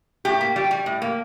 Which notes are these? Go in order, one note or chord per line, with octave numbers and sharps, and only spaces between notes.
A2 G4
A#3
G3
G3
A2
A#3